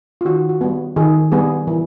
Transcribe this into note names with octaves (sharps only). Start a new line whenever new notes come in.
F4
D#3 F#4
F#4
G3 B3
D#3 G#4
G3 B3 G#4
E3